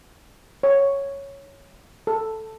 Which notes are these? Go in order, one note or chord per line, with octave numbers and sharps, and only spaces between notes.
C#5
A4